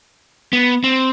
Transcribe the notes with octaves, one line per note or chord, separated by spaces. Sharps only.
B3
C4